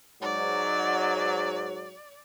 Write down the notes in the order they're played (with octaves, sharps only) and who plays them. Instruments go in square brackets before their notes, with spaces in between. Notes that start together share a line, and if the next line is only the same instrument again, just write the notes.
[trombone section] G#2 F#3 [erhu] D5